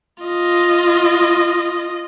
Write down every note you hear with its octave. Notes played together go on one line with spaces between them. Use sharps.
F4 D#5